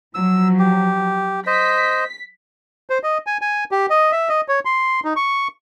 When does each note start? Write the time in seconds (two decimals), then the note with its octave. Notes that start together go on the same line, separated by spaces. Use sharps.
0.14 F3 F#3 E6
0.59 G4
1.47 C5 D#5 B6
2.90 C5
3.03 D#5
3.27 G#5
3.41 G#5
3.71 G4
3.90 D#5
4.12 E5
4.29 D#5
4.48 C#5
4.65 C6
5.05 D#4
5.16 C#6